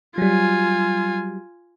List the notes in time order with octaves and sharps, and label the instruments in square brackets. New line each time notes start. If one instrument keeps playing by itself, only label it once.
[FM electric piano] F#3 G3 [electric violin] F4 G#5